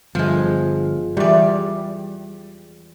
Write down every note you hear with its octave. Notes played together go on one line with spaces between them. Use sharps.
G1 F3 G#3
E2 G3 D5